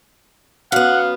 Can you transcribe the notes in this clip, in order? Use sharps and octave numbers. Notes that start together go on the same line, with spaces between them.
F#2 B3 F5 F#5